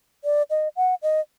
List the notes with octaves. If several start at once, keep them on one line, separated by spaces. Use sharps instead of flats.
D5
D#5
F#5
D#5